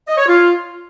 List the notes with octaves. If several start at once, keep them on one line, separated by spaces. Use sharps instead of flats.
D#5
C#5
F4